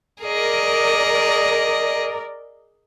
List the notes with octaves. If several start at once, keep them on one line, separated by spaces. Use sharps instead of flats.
G#4 A#4 D5 D#5